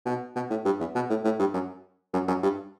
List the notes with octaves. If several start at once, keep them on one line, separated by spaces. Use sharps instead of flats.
B2
B2
A2
G2
E2
B2
A2
A2
G2
F#2
F#2
F#2
G2